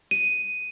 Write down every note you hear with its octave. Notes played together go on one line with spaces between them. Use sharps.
D#7